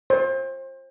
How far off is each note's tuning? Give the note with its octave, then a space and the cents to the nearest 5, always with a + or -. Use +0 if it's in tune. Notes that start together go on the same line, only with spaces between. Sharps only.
C5 +30